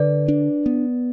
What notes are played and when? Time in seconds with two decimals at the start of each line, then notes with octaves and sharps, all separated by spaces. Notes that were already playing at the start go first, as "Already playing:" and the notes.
Already playing: D3 B4 D5
0.28 D4
0.66 B3